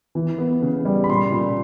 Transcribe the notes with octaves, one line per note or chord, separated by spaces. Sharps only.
E3
B3
C#3
G3
B5
A#2 C6
A#2